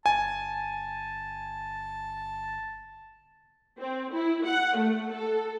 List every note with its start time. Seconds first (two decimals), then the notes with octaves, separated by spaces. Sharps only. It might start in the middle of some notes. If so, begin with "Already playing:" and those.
0.06 G1 G#5 A5
3.79 C4
4.14 E4
4.46 F#5
4.77 A3
5.13 A4